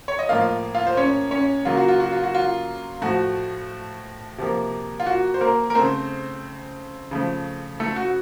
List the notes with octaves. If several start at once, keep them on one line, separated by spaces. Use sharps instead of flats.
C#5
D#5
A2 F3 A#3 F4 F5
F4 F5
C5
C#4 C#5
C#4 C#5
C#3 F#3 A#3 F4
F#4
F4
F#4
F4
F#4
F4
A2 F3 A3 F#4
C3 F3 A#3
F4
F#4
C5
A#3 A#4
A#4
C#3 A3 C4 C5
C#3 F3 A3
A3 A4
F#4